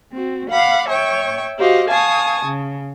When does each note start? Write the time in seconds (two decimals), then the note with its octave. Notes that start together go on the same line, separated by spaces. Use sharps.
0.12 C4 F#4
0.49 F5 F#5 B5 D6
0.89 C#5 E5 G5 C#6
1.58 F#4 G4 C5 D#5 F5
1.88 F5 G#5 A5 C#6 D#6
2.46 C#3